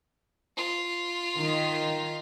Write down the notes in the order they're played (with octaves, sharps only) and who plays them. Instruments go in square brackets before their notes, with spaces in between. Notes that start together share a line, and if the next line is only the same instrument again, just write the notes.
[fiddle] F4
[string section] D#3